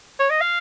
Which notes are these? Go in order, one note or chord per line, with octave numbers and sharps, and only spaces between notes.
C#5
D#5
F5